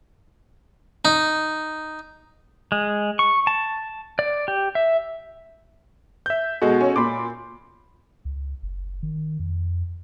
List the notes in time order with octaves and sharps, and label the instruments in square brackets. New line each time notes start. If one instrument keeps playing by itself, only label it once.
[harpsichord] D#4
[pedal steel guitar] G#3
C#6
A5
D5
G4
E5
[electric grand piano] E5 G6
[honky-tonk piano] B2 G#3 [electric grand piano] F#4 A4 D#5
[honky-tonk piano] C#4
[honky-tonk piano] A#2 [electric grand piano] B5 C6 D6
[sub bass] C#2
F#1
D#3
F2